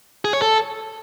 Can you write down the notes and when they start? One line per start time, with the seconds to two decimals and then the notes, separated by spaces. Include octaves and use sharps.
0.25 G#4
0.33 C#5
0.42 A4